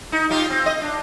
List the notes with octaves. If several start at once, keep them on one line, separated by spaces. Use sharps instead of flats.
D#4
D#4 F4 G4
C4
D#5
D4